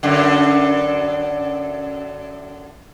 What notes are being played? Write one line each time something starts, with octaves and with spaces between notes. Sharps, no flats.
F#2 D3